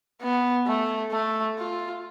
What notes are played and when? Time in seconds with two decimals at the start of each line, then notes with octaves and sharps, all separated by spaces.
0.22 B3
0.67 A3
1.12 A3
1.58 F4